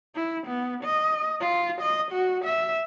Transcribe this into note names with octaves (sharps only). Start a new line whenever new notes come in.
E4
B3
D#5
F4
D#5
F#4
E5